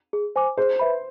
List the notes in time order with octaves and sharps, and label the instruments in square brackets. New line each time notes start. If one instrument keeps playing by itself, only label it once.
[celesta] G#4
C5 G#5 D6
[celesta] G#4 [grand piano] C5
[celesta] B4 E5 B5